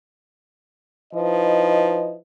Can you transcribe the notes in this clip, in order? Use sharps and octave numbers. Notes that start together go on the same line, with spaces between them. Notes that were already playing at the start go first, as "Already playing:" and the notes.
F3 D#4 E4 B4 D#5